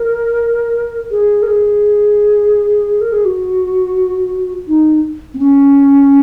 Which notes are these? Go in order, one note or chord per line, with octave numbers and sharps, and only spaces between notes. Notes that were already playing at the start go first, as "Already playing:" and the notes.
Already playing: A#4
G#4
A#4
G#4
A#4
G#4
F#4
D#4
C4
C#4